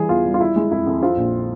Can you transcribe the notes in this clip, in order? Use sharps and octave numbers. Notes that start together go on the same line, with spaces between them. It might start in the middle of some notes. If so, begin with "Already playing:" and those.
Already playing: E3 G3 G#4
E2 F4
G3
F4
E4
G#3
F2 E4
F2
C4 F4
A#1